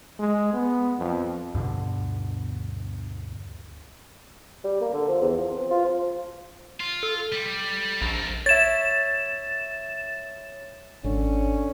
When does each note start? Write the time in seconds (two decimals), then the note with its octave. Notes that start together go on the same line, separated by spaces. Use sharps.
0.20 G#3
0.53 B3
0.98 F2
1.55 D2 G2 B2 D3
4.64 G3
4.81 A#3
4.93 D3
5.08 F3
5.22 E2
5.37 F3
5.51 C4
5.70 F4
5.85 F3
6.80 F4
7.03 A4
7.32 G3
8.02 A#1 A#3 A4
8.46 C#5 E5 A6 E7
11.04 G#1 D3 C#4